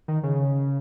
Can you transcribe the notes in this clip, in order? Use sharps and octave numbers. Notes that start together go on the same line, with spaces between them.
D#3
C#3